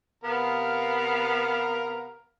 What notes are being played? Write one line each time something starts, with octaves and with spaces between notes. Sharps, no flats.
C3 B3 A#4 F5